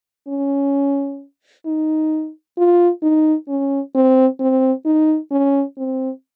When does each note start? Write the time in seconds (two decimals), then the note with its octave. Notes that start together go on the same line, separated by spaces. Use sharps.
0.28 C#4
1.66 D#4
2.58 F4
3.03 D#4
3.48 C#4
3.95 C4
4.40 C4
4.86 D#4
5.32 C#4
5.78 C4